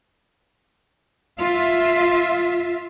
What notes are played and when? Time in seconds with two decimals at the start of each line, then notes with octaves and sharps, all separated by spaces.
1.41 F4 E5